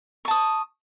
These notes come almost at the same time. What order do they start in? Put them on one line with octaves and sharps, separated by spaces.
C#6 A5 D#6